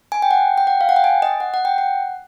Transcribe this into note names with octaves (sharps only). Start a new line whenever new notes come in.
G#5
G5
F#5
G5
F#5
F5
F#5
G5
G#5
D#5
F#5
F#5
G5
F#5